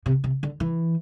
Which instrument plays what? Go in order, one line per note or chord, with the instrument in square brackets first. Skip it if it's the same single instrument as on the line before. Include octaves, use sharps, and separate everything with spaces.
[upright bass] C3
C3
D3
E3